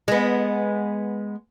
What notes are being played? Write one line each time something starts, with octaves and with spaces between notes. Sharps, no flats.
G#3 B3